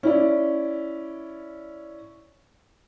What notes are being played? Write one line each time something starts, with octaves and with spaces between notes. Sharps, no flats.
C#4 E4 D5